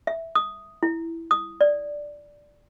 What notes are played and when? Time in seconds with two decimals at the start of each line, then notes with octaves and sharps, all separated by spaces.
0.07 E5
0.35 D#6
0.83 E4
1.31 D#6
1.61 D5